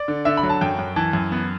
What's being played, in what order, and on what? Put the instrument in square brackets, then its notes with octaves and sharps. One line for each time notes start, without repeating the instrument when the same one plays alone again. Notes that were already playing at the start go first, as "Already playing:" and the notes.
Already playing: [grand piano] D5
D3
D3 E5
B5
F#3
A5
F#2 G5
F#2
E3 A5
F#2
B3